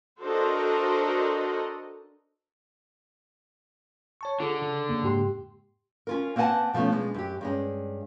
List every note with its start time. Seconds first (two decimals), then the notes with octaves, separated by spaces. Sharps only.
0.23 D4 F#4 A4 A#4 C5 D#5
4.21 C#5 A5 C#6
4.40 D3 F4 G#4 A4
4.61 C#3 A4
4.89 F2 C#3 A#3
5.04 G#2 G4 C6
6.07 C#4 F4 A#4
6.36 A#3 C4 B4 F#5 G#5 A5
6.73 B2 F3 A3 B3 C#4
6.92 B2 G#3 D4
7.14 F#2 G4
7.41 G2 G#3 C#4